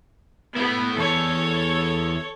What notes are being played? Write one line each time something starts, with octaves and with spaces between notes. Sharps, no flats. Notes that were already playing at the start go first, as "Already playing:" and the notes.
A3 B3 E4
E2 E3 A4 C#5